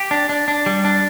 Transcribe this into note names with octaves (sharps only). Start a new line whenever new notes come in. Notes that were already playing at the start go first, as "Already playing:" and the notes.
Already playing: G4
D4
D4
D4
G3
D4